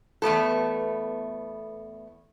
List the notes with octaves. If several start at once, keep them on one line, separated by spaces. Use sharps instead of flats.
E2 A3 B3 A4